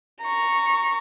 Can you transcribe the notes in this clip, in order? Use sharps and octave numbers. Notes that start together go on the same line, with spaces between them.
A#5 C#6